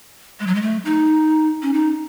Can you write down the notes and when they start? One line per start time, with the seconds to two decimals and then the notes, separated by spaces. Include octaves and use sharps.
0.40 G#3
0.47 F#3
0.55 G#3
0.62 A3
0.85 D#4
1.62 C#4
1.74 D#4